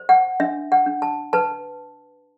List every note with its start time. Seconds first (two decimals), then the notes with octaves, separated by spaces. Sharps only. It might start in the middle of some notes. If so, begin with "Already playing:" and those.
Already playing: C5
0.09 F#5
0.40 D4 E5
0.72 F#5
0.86 D4
1.02 A5
1.33 B4 A5